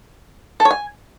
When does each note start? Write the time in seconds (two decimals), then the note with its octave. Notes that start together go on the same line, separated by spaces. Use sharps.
0.60 A4
0.65 C#5
0.71 G#5